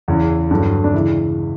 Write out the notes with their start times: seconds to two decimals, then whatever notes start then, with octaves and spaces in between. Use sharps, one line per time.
0.08 E2 C#3 E3
0.51 G2 D3 F#3
0.84 D4
0.94 C#2 C#3 E3 E4